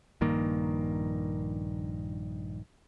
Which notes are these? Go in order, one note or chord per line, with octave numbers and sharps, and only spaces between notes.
A#1 G2 D#3 A#3